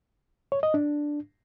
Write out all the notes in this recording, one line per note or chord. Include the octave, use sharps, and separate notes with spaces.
C#5
D#5
D4